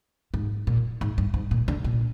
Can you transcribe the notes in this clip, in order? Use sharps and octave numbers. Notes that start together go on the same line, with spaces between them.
G#2
A#2
G#2
G2
G#2
A#2
D3
A#2